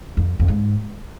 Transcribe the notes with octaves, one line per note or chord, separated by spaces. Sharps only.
F2
F2
G#2